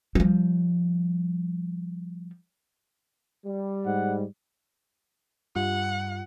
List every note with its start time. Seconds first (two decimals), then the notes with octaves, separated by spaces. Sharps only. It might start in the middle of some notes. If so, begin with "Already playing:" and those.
0.15 F3 G3
3.45 G3
3.86 G#2 F#5
5.55 G2 G3 F4 F#5